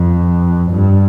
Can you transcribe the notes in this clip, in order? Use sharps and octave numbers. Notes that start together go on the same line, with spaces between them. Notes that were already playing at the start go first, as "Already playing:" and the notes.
Already playing: F2
G2